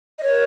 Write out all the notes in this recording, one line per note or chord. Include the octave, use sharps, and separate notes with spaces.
D#5
A#4 C#5